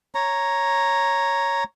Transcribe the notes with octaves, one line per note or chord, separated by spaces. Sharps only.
C#5 A#5